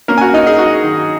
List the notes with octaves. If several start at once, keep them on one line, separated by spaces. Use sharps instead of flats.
A#3 C#4 A#4
G#5
F#4 F#5
A#3 D#4 D#5
G#4 G#5
F#3 F#4 F#5
D#3